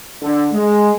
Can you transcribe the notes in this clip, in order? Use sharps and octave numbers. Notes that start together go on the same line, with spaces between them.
D3
G#3